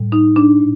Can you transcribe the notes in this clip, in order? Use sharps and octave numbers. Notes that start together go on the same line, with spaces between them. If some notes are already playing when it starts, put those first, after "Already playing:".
Already playing: A2 G3
D#4
D4
A#2